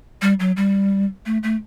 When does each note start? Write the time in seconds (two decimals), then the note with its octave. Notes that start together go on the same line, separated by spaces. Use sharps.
0.22 G3
0.40 F#3
0.57 G3
1.26 A3
1.43 A3